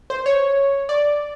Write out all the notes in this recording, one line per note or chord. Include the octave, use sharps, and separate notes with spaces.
C5
C#5
D5